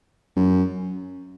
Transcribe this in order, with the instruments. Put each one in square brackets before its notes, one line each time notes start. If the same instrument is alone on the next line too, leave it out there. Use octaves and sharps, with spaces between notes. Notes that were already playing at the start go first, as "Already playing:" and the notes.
[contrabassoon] F#2